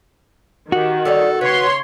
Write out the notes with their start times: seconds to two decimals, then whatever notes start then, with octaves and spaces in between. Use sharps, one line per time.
0.72 D#3 F#4 G4
1.05 G3 A4 C#5 D#5
1.41 C#3 B4 C#5 C6